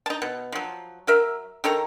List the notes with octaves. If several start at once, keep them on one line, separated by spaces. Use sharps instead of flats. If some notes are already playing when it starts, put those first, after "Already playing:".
D#4 A5
B2
F3 F#3
F#3 A#4 E5
D#3 A4 C#5 A#5